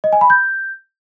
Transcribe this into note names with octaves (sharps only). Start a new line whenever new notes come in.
D#5
G#5
B5
G6